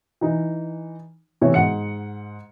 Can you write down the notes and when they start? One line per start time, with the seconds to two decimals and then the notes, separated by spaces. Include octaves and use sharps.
0.21 E3 D#4
1.41 A2 C3 E3 B3 C#5 E5
1.54 G#2 F#5 C#7